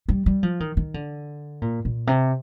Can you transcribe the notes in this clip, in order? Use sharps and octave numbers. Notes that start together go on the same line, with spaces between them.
G3
G3
F3
D#3
D#3
D3
A#2
A#2
C3